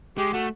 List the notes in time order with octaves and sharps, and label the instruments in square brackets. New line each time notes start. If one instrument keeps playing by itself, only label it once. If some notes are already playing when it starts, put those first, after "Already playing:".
[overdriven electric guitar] G#3 [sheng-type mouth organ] G4
[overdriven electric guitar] A3 [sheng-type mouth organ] F#4